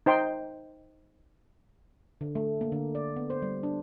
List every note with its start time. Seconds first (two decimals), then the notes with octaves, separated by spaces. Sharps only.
0.06 D#4 C5 G5 C6
2.21 D3
2.35 A3
2.61 A#3
2.72 D3
2.95 D5
3.16 B3
3.30 C5
3.42 G3
3.63 D4